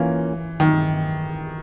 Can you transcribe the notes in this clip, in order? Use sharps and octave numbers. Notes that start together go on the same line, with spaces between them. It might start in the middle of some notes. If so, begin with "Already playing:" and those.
Already playing: E3 A#3 C#4 F4
D#3